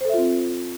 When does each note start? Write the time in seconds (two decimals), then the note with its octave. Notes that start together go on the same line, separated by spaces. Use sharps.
0.01 C5
0.05 A4
0.09 E5
0.14 F4
0.18 C4